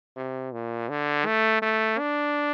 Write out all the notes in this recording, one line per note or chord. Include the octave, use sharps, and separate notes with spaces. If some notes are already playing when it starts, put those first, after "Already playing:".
C3
A#2
D3
A3
A3
D4